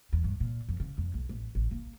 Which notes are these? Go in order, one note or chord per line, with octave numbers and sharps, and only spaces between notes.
E2
G2
A#2
F2
C#3
F2
B1
A1
A1
A#3